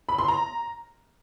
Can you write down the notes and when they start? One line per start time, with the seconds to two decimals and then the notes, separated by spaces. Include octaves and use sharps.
0.09 B5
0.18 C6
0.28 A#5